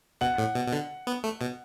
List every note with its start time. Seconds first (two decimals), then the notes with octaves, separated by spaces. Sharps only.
0.21 B2 F#5
0.38 A2
0.55 B2
0.67 B2
0.72 D3
1.07 B3
1.24 A3
1.41 B2